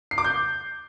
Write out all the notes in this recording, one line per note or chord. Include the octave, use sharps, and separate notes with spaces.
C7
D6
G6